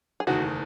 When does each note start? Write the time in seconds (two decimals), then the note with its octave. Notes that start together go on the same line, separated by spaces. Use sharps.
0.20 G#4
0.27 F#1 E2 D#3 A3 F#4